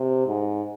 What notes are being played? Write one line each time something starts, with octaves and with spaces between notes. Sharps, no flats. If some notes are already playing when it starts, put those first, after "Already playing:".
Already playing: C3
G#2